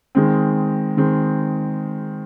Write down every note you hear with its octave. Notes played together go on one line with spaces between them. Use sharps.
D#3 G#3 C4
D#3 G#3 C4